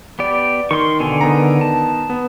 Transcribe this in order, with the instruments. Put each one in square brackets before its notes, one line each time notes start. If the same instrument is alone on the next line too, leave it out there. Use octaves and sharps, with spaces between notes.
[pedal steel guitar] B3 G4 D5
[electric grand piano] D#3 [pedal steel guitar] C6 C#6
[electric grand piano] B2 [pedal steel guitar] D3 A4 G#5
[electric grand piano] D#3 B3 A#5
[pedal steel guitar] A5
[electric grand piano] B3